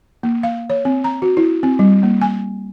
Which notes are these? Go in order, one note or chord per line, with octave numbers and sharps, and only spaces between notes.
A#3
F5
C#5
C4
A#5
F#4
E4
C4
G3
A#3
G#5